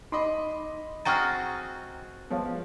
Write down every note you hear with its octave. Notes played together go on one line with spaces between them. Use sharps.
D#4 D#5 B5 C6 D6
C4 F#4 G#4 A#5 C#6 F6 A6
F3 G#3 B3 C#5 F5